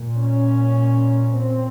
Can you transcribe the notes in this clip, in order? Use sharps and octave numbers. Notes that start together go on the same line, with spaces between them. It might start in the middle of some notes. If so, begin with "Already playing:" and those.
Already playing: A#2
C#4
C4